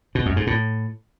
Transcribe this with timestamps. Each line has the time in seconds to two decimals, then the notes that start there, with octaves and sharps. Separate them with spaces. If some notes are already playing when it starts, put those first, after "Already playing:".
0.15 B2
0.26 F#2
0.36 G#2
0.47 A2